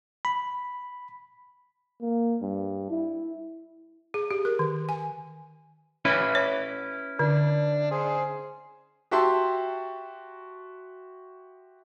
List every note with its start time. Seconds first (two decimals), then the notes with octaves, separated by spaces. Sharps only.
0.25 B5
2.01 A#3
2.41 G2
2.90 E4
4.14 G#4
4.31 G4
4.45 A#4
4.59 D#3
4.89 G#5
6.05 C#4 E4 B4
6.35 C#5
7.19 D3 D4
7.91 G#4 C5
9.11 F#4 G4 E5 A5 C6